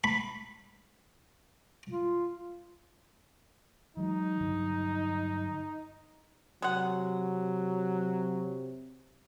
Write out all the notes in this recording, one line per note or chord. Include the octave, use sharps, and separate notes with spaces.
B5
F4
E3 F#3 G#3 D#4
G2 D3 F#3
C3 F#3 G#3 F#5